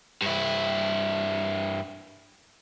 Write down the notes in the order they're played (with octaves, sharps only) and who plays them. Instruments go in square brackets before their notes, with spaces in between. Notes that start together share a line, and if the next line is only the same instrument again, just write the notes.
[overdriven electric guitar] G2 E4